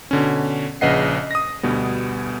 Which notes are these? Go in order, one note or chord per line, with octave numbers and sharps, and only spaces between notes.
B2 D3 C#4
A#1 C#3 B4 D#5 F#5 C7
D#6 A#6
D2 B2 G3 B3